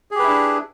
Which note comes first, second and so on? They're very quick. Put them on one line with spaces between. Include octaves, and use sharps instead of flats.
G#4 G4 B4 E4 D4